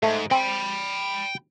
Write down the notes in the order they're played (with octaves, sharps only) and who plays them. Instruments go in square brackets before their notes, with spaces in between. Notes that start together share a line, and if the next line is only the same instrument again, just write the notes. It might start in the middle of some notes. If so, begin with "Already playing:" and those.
[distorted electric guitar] G#2 [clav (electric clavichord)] A3
[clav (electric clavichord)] C4 [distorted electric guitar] G5 B5